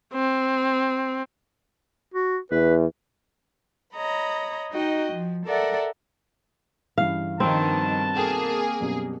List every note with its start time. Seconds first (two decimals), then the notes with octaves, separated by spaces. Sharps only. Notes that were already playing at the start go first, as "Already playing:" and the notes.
0.13 C4
2.14 F#4
2.51 E2 B4
3.96 C#5 D#5 A#5 B5
4.71 D#4 F#4 D#5 G5
5.13 F3
5.46 A4 A#4 D5 E5 F#5
6.98 G2 C#3 E3 F5
7.40 G2 B2 D#3 F3 C4 A5
8.16 A#3 G#4 A4 G5
8.80 F#2 B2 G3